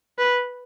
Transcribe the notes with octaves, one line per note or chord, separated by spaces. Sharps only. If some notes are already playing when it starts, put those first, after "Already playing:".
B4